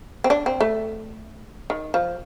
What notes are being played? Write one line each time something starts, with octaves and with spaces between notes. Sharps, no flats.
C4
D4
C4
A3
D#3
F3